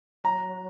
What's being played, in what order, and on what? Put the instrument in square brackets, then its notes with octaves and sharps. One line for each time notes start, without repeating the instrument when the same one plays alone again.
[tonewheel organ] F#3 [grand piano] A#5